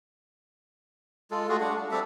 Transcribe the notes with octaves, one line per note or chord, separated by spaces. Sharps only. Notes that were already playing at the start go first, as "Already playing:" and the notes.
G#3 F4 A4
A3 F4 F#4 G#4
G3 D4 F#5
D4
G3 C4 A4 E5